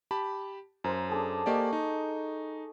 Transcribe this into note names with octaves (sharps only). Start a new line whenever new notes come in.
G4 A5 B5
F#2 A#4 C5
D4 G#4 A4
A#3 G4 D5 D#5 C#6
D#4